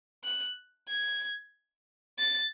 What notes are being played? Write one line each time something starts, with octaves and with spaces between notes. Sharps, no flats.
F#6
G#6
A6